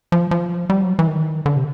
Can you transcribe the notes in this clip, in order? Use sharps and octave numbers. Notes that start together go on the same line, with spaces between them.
F3
F3
G3
F#3
E3
D#3
D3
C3